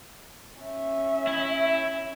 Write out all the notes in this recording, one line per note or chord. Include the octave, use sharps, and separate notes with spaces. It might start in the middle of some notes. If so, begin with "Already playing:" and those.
C#4 E5
E4